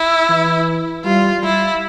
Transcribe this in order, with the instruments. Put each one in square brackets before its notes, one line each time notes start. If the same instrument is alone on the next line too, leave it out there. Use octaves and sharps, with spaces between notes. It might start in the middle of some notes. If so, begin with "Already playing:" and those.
Already playing: [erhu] E4
[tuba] E3
[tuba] G3 [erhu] F4
[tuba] G3 [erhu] E4